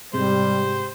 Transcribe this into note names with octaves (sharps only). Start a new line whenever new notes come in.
G#2 C3 G3 G#3 G4 C5